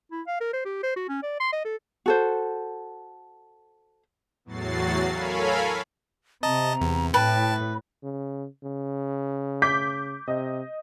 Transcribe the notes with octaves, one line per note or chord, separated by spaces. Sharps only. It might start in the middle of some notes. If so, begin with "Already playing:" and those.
E4
F5
A#4
C5
G4
C5
F#4
C#4
D5
C6
D#5
A4
F#4 A4 C5
E2 A2 F#3 F#4 A6 C7
A4 A#4 C#5 F5 G#5 B5
C3 D#5 A5 A#5
E2
A2 B4 G5 A5
C#3
C#3
D6 G6 B6
C3 D#5